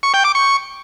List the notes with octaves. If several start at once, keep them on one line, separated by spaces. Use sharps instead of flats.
C#6
G5
D6
C#6